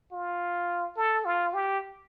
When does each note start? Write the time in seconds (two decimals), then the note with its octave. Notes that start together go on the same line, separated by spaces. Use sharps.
0.12 F4
0.97 A4
1.25 F4
1.54 G4